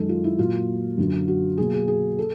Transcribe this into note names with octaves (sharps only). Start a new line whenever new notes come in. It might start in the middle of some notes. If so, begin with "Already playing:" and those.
Already playing: F#2 D#3 G#3 A4
F4
E4
A#2 F#3 A#3 F4
F#2 D3 F#3
F#4
B2 F#3 A#3 G#4
G#4
G#4
A4